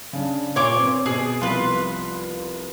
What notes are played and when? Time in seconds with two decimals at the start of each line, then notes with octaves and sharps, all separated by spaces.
0.13 C#3 D4
0.56 A#2 C#5 C6 D6
0.74 C4 B4 C5
1.06 B2 G#4
1.41 C2 F3 B3 F4 B4